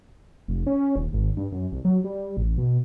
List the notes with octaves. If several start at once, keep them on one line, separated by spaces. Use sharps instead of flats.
F1
C#4
D#1
G#1
G2
F#2
C2
F#3
G3
A1
B2